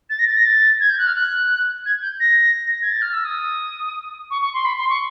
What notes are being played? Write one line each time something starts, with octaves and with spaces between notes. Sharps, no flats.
A6
A#6
A6
A#6
A6
G#6
G6
F#6
F6
F#6
G#6
G6
A#6
G#6
A6
F6
E6
D#6
C#6
C#6
C6
B5
C6
C#6